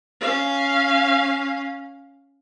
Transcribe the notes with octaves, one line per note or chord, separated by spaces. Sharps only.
C#4 F5